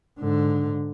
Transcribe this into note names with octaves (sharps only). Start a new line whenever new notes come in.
G#2 D3